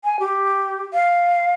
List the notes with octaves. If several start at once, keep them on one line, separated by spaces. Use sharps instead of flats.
G#5
G4
F5